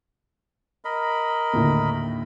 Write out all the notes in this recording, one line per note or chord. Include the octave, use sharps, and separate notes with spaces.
A#4 D#5 B5
D#2 A2 D3